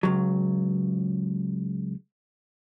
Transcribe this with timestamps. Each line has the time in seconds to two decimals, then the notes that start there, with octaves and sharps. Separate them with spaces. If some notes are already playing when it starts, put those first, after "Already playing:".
0.03 C#2 F#3